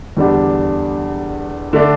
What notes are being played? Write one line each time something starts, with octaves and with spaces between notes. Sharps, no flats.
E2 D3 G3 D4 G4
D3 A3 D4 A4